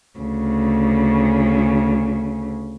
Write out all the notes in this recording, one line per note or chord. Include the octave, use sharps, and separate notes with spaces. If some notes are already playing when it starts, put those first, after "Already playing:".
D2 C#3